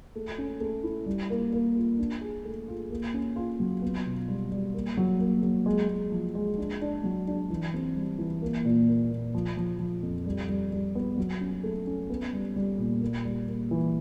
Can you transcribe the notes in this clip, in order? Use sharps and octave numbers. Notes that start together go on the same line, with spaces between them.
A3
C#4
A3
E4
G3
A#3
A#3
F4
D4
G#4
A3
F4
A#3
C#4
F4
F#3
B3
B2
G3
G3
A#3
F#3
A#3
F#3
G#3
G#3
F3
G#3
D4
D4
F#3
D4
E3
C4
G3
E3
A#3
A#2
A#3
A#2
F3
F3
F3
F2
G3
G3
G3
B3
F#3
C#4
A3
C#4
B3
G3
G3
A#2
A#3
G3
A#3
E3